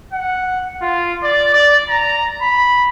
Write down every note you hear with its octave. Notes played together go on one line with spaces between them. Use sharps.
F#5
F4
D5
D5
A#5
B5